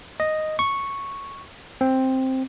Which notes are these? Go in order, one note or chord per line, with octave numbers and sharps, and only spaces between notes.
D#5
C#6
C4